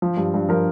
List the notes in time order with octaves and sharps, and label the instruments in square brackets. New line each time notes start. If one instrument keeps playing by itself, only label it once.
[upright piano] F3
G2
G2
F3 A#4